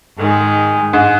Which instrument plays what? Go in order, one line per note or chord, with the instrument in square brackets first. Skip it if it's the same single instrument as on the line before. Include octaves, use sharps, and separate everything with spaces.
[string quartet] G#2 D#3 G#3
[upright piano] G#2